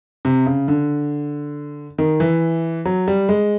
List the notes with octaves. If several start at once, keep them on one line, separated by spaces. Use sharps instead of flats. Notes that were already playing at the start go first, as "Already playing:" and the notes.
C3
C#3
D3
D#3
E3
F#3
G3
G#3